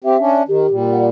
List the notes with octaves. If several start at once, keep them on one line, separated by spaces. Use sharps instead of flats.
C4 G4 E5
C#4 D4
D#3 G4
A#2 G3
F#5